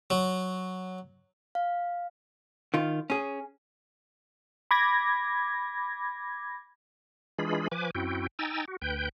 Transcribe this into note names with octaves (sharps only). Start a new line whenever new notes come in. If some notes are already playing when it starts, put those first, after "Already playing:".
F#3
F5
D#3 F4
C#4 G#4
B5 D6 G#6 A#6
E3 G#3 D4 F4 G#4 B5
F3 B4 G#5 D6
F#2 C4 E4 F#4 G5
D#4 G5 G#5 A#5 E6 A6
F#4
D2 B4 G5 G6